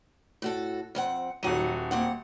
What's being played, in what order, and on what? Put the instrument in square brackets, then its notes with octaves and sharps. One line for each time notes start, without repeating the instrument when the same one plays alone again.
[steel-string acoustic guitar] A2 F#4 A4
F2 C4 F#5
[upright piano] D#1 F#4 D#7 [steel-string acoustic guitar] F#3 F#5
[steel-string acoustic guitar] A#3 C4 F#5